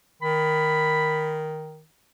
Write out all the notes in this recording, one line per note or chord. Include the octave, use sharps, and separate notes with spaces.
D#3 B5